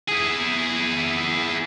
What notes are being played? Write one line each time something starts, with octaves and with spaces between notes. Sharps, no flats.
E4 G#4